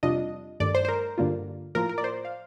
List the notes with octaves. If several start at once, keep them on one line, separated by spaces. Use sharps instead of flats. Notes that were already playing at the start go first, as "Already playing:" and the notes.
F2 C3 G3 D4 F4 D#5
G2 D#3 A3 D5
C5
C5
A#4
G2 D3 G3 A#3 F4
A2 F3 A#3 F4 A#4
A#4
D5
C5
F5